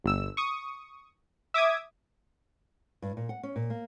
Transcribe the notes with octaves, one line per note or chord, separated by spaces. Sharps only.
G1 E6
C#6 D#6
E5 D6 D#6 G#6
G2
A#2
F#5
C#4
A#2
A#3